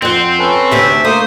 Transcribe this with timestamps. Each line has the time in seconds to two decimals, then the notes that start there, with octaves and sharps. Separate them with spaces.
0.02 F2 C4 F#5
0.39 C#4 A4 B4
0.71 D2 C3 G4 E5
1.05 A3 A#3 C5 D#6